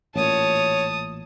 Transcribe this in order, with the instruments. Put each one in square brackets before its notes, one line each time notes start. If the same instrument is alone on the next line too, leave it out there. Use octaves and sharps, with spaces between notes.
[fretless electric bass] A1 A#2 [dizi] C#5 [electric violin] A5 D#6